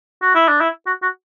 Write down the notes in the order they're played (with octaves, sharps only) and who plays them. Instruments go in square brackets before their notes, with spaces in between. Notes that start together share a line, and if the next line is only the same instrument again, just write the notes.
[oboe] F#4
E4
D4
E4
F#4
F#4